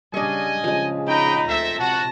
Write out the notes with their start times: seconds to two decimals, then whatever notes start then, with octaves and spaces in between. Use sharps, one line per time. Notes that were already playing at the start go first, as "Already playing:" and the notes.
0.14 C#3 G3 D4 D#5 G#5 C#6
0.64 C#3 F3 G#3
1.08 D#4 F#4 D#5 G5 B5
1.48 D2 C4 A4 E5 A#6
1.78 C3 F#4 A5 A#6